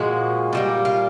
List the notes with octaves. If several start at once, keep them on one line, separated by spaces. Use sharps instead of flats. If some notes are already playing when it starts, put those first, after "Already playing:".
Already playing: A#2 F3 G#3 F#4
A#2 G3 A#3
F4